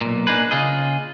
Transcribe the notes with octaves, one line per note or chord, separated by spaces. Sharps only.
B1 A#2
A#3 D4 D#4 G#4 B4
C#3 F4 G#4 D#5